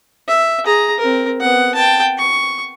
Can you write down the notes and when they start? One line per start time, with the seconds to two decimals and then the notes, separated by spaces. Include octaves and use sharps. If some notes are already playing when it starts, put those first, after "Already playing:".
0.28 E5
0.65 G#4 A#5
0.99 C4 A#4
1.41 B3 F#5
1.75 G5 A5
2.18 C#6